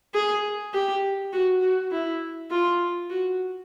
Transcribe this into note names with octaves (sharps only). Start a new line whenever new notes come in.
G#4
G4
F#4
F#4
E4
F4
F#4